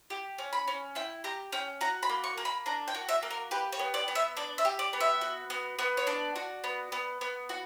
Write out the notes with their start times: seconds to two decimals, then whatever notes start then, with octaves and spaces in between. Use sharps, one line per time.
0.10 G4
0.38 C#4
0.53 B5
0.67 C#4
0.95 E4 G5
1.24 G4 A#5
1.52 C#4 G5
1.81 F#4 A#5
2.03 B5
2.09 A#3
2.24 C#6
2.38 A#3
2.45 B5
2.66 D4 A#5
2.88 G5
2.95 F#4
3.09 E5
3.23 A#3
3.31 A#4
3.51 G4 B4
3.72 C#5
3.79 B3
3.94 D5
4.08 B3
4.15 E5
4.37 D4 D5
4.58 E5
4.65 G4
4.79 D5
4.93 B3
5.00 E5
5.21 F#4
5.50 B3
5.79 B3
5.97 C#5
6.07 D4 D5
6.36 F#4
6.64 B3
6.92 B3
7.21 B3
7.49 F#4